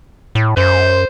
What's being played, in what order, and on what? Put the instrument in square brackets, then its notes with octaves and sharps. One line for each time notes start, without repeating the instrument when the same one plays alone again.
[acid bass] A2
[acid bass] F#2 [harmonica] C5